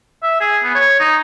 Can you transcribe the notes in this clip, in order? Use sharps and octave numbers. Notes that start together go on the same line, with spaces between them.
E5
G#4
B3
C#5
D#4